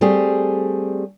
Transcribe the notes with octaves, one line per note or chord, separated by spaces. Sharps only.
G3 A3 C4 G4 G#4